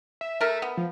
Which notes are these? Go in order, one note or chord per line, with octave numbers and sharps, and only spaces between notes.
E5
A3 A#4
B3
F3